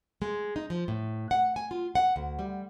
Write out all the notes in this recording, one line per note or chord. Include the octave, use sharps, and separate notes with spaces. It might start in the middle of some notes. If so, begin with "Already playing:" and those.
G#3
D#4
F3
A2
F#5
G#5
F4
F#5
D2
G3